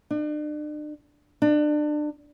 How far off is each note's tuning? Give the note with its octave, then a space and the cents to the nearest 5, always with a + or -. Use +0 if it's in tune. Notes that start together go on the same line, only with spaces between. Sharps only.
D4 +40
D4 +30